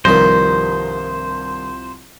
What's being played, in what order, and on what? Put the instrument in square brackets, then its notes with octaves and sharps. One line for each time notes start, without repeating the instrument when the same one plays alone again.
[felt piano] C2 F3 A#6 [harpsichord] G2 D#3 [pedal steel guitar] C5